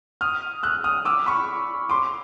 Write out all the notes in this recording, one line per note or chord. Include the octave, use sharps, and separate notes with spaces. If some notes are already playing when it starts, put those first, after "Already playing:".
D#6 F6
E6 F#6
D#6 F6
D6 E6
B5 C#6
C6 D6